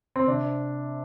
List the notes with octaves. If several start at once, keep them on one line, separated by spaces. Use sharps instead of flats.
C4
C3 D4